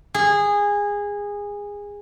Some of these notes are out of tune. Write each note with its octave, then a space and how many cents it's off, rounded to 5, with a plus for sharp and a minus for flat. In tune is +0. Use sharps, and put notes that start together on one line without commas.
G#4 -20